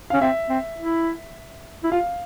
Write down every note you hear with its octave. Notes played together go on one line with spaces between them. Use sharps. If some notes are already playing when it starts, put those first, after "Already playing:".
C#4 F5
C4 E5
C4
E4
E4
F4 F5